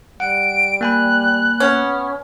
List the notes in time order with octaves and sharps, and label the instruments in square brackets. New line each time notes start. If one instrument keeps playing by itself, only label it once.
[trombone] G3 [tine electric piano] F#5 [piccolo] D7
[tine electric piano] A#3 G#5 B5 [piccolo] F#6
[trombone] B3 [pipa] C#4